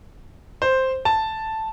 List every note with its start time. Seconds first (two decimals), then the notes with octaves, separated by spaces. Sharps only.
0.62 C5
1.05 A5